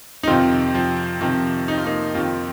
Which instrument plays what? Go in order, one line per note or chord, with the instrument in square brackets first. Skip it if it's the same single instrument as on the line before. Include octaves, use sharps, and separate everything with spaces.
[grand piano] D#4
F2 C3 D#3 C4 F4
F3
F2 C3 D#3 F3
D#4
F4
A#3 D#4
F2 D#3 C4 F4